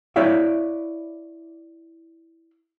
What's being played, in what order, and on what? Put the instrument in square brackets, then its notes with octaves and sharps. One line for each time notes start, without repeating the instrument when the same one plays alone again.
[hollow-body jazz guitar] E4 C#5 D5 E5 F5